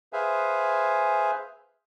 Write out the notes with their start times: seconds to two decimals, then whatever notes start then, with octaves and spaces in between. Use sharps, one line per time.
0.13 G#4 B4 C5 E5 F5 G#5